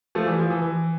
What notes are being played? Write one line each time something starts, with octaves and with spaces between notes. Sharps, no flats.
F3 A3
E3 G3
F3
E3
E3